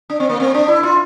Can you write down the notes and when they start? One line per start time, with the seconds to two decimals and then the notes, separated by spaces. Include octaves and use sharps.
0.10 D4
0.20 C4
0.29 A#3
0.40 C4
0.54 D4
0.68 E4
0.83 F4